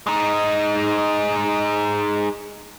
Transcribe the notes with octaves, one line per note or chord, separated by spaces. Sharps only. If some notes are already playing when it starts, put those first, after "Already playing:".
G#3 D#4